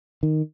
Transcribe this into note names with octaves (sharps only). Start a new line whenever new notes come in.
D#3